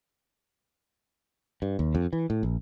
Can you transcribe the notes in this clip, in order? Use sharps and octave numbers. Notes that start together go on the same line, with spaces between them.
G2
D#2
F2
E3
A2
A#1